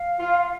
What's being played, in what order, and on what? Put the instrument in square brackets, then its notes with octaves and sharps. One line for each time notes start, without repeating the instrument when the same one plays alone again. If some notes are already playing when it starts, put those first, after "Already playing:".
Already playing: [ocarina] F5
[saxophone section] F4